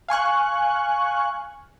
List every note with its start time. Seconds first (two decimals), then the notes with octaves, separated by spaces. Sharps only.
0.09 F5 G#5 C#6 F#6